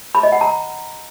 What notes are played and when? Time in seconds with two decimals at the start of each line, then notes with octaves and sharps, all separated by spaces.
0.15 B5
0.23 D#5
0.32 F#5
0.41 A#5